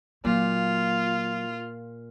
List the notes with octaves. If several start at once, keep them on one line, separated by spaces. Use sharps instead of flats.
A#2 F#3 F4